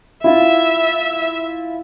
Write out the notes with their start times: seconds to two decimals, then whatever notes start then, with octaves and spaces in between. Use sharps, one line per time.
0.24 E4 F4 E5